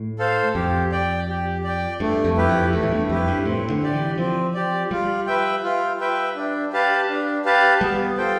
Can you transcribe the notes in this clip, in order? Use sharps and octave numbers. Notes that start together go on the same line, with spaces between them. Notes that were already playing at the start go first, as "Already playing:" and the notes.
Already playing: A2
A4 C5 F5
F2 G4
D5 G5
G4
D5 G5
G2 A3
F2
E4 G4 B4
F2
E2 A3
A2
G2
F2 E4 G4 B4
G2
A2 C4
D3
G4 D5
E3
F3 C4
G4 D5
G3 F4
B4 E5 G5
F4
B4 E5 G5
D4
G4 B4 F5 A5
D4
G4 B4 F5 A5
G3 B3
F4 A4 C5 G5